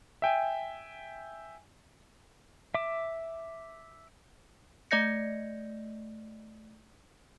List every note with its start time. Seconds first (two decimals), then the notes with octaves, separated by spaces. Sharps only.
0.22 E5 G5 G#5
2.74 E5 D6
4.91 A3 D5 D#5 G6 A#6 C#7